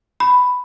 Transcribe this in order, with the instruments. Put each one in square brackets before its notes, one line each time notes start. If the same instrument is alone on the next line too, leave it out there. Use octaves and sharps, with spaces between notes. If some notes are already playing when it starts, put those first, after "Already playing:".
[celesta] B5